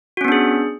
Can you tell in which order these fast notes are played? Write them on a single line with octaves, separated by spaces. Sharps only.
F#4 C#4 B3 D4 G#4